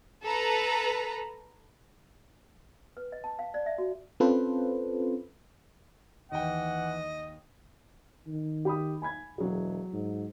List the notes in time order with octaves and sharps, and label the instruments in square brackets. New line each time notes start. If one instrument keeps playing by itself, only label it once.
[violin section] A4 B4 A#5
[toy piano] B4
D#5
A5
F5
D5
E5
F#4
[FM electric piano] C4 C#4 F4 A4 B4 C5
[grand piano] D#2 G5 [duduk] E3 [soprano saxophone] D#5 [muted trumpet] F#5
[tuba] D#3
[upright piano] G4 B5 D#6
G#5 B5 G#6
[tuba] E1 [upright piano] F#3 G#4
[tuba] G#2